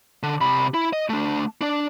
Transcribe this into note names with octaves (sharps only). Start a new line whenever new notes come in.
D3
C3 B5
E4
D#5
A3 D4
D4 D5